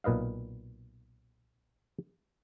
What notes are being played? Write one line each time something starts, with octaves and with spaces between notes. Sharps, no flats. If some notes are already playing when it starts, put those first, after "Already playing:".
B1 A#2 B4 D#5 F5